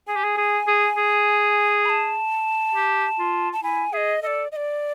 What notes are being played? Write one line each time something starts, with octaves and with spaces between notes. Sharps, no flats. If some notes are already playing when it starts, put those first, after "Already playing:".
G#4 G#5
G4
G#4
G#4
G#4
G#4
B5
A5
G4
F4
A5
E4 G#5
G#4 D#5 E5
A4 D5 D#5
D#5
D5